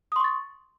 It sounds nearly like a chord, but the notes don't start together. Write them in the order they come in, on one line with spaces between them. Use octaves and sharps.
D#6 C6 C#6 A6